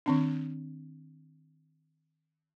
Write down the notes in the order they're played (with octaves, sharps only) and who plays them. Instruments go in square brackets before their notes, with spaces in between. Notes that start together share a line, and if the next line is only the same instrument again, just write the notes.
[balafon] D#3 C4 D4